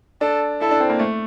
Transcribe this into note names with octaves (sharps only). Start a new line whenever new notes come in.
D4 A4
E4 A4
D4
C4
A#3
A3